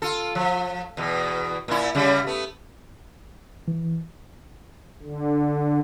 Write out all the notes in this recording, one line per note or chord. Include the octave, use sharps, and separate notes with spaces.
F4 A4
F3
E2 B2
A#2 E4
C#3 G3
A3 B3
E3
D3